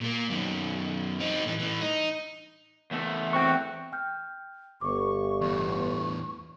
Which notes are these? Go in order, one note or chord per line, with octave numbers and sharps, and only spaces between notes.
A#2 A#3
F#2 D#3
C4 D#4
A2 E3
A2 E3
D#4
E2 A3
C4 F#4 G5 C#6
G5 F6 G6
G1 C#6 D6
E2 A2